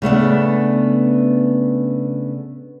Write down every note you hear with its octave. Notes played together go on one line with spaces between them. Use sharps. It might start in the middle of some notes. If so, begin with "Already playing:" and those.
C#3 A3 B3 D4